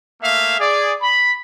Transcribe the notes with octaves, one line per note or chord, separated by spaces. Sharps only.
A3 A#3 E5 F5
G#4 D5
B5